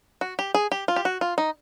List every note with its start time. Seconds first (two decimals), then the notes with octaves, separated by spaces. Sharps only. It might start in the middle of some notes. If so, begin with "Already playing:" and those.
0.21 F#4
0.39 G4
0.55 G#4
0.72 G4
0.88 F4
0.96 G4
1.05 F#4
1.21 F4
1.38 D#4